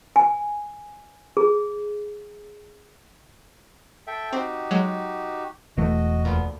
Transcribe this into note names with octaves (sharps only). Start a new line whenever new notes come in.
G#5
G#4
A4 E5 G5
C4 D#4 F#4 G4
F#3 G#3
E1 E3 A3 F#4 D#5
D2 A#2 B3